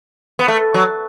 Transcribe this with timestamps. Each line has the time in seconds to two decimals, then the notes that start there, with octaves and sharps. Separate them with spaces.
0.39 B3
0.48 A3
0.74 F#3